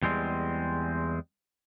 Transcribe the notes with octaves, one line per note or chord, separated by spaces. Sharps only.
E2 G3 G#3 C4